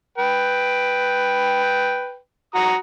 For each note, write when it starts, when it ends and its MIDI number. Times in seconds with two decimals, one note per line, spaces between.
0.18 2.16 71
0.18 2.16 79
2.55 2.75 66
2.55 2.75 82
2.55 2.75 87